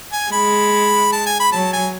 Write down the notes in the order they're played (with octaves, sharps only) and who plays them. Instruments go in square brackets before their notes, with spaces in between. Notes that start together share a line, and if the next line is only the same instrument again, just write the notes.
[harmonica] G#5
[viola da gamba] G#3 [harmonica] B5
[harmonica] A5
G#5
B5
[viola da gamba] F#3 [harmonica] A5
[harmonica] G#5